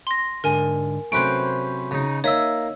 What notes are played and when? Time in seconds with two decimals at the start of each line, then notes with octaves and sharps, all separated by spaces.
0.07 C6 A#6
0.44 G#2 D3 A#4 G#5
1.12 C3 F#3 A3 C#4 B4 C5 D7
1.91 C#3 D#4
2.24 A#3 D#4 C#5 E5 E6